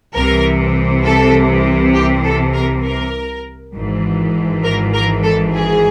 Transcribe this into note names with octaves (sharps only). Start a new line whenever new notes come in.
C2 C3 E3 A#4
A4
G4
A4
A#4
A#4
G#1 G#2 E3
A#4
A#4
A4
G#4